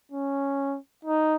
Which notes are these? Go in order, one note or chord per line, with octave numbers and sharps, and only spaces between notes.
C#4
D#4